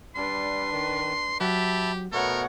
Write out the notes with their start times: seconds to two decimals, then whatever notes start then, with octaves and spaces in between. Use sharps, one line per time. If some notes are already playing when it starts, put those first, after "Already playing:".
0.16 G3 D4 B4 C6
0.72 D#3
1.40 F#3 G4 E5 A5 B5
2.12 B2 A3 B3 A#4 C#5 F#5